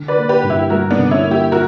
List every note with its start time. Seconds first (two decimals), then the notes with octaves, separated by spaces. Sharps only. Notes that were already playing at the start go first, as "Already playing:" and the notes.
Already playing: D3
0.08 B4 D5
0.16 A#3
0.29 G4 B4
0.43 G2
0.50 E4 G4
0.70 G3 F#4 A#4
0.91 B3 D4
0.97 D3
1.11 C#4 E4
1.24 A#3
1.31 E4 G4
1.52 F#4 A#4